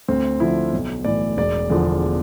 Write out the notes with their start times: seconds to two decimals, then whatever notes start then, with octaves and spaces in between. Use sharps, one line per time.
0.08 D2 C4
0.40 D3 F3 E4
0.73 B1
1.05 A2 E3 D5
1.37 E1 D5
1.70 E2 D3 F3